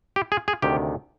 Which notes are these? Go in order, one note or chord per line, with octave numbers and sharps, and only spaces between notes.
G4
G#4
G#4
D2 C3 D#3 G4